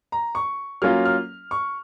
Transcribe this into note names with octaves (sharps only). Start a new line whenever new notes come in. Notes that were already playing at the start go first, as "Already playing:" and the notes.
A#5
C#6
F#3 A#3 C#4 F4 F6
F6
C#6